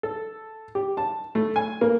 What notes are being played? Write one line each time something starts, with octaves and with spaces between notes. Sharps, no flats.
A4
G4
A5
A3
G#5
A#3